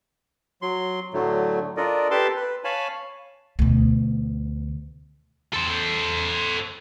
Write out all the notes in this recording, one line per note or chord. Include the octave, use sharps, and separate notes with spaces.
F#3 C6
A2 D3 F#3 A3
D4 F4 A4 A#4 D5 D#5
G4 A4 B4 A5 C6 D6
B4
C#5 F5 G#5 A5 B5
D2 B2
A4 C5